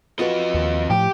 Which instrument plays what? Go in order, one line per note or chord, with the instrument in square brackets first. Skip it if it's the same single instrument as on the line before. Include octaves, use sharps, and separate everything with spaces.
[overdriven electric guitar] F2 D#5 [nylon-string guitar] F4 F#4 B4
[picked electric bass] D#2
[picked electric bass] A2 F3 [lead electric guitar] G4